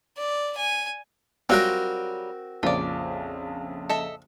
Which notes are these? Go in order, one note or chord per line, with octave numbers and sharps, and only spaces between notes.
D5
G#5
F#3 G3 C4 F4 F#4 A#4
A#1 F2 C#3 F4 D5
A4 D#5 E5